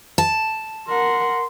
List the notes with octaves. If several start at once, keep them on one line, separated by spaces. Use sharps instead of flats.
A5
A#4 F#5 C6